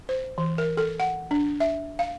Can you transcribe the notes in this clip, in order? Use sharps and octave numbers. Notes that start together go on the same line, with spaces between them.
C5
E3
A#4
A4
F#5
D4
E5
F5